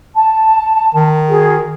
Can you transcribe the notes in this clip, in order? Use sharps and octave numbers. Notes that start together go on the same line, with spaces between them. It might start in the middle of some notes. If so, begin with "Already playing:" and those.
A5
D#3
F#4 G#4